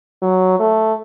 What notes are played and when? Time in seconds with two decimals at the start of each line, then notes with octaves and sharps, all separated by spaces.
0.22 F#3
0.60 A3